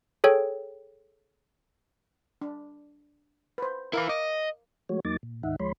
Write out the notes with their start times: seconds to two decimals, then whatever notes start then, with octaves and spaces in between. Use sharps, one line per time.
0.24 G#4 A4 C#5 G5
2.41 D4
3.58 B4 C5
3.93 E4 A#4 B4 F5 D6
4.09 D#5 D6
4.89 F3 G#3 A3 F#4 C#5
5.05 E2 F#3 A#3 D#4 D6 A6
5.23 A#2
5.43 D2 G#2 D#3 D#4 E5 F#5
5.60 D2 F3 G#3 C#5 B5 C6